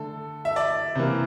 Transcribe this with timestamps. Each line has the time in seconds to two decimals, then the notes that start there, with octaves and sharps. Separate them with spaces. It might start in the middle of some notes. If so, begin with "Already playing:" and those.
Already playing: D3 A3 A4
0.45 E5
0.56 D5
0.95 C3 E3 A#3